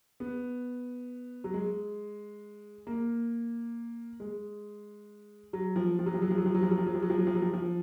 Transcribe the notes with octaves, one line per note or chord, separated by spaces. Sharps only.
B3
F#3
G#3
A#3
G#3
F#3
F3
F3
F#3
F3
F#3
F3
F#3
F3
F#3
F3
F#3
F3
F#3
F3
F#3
F3
F#3
F3
F#3
F3
F3